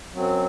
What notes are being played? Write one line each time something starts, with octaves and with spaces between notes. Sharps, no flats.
F#2 F#3 C4